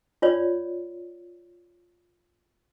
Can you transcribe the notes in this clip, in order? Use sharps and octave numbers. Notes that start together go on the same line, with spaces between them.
F4 C#5 D5